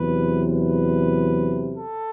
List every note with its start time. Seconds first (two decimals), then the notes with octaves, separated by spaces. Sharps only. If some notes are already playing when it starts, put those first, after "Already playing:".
Already playing: E2 C3 F#3 B4
0.51 B4
1.74 A4